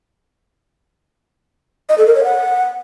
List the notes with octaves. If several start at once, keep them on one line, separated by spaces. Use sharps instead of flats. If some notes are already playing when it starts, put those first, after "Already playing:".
D#5
A4
A#4
C#5
F#5